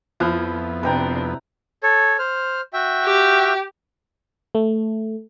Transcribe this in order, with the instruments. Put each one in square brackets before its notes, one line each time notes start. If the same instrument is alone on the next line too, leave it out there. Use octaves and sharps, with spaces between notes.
[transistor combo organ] F2 B3 [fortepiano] F3 [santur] E4
[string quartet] C3 D4 [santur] B4 G5 A#5
[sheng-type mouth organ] A4 C#5
C5 F6
F#4 E5 G5
[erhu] G4
[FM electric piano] A3